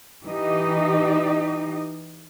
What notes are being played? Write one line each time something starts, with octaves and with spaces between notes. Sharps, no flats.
E3 D#4 G4 D#5